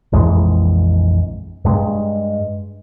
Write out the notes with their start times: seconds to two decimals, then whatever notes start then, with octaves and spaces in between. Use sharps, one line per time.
0.12 A#1 F2 E3 G#3
1.65 G2 G#3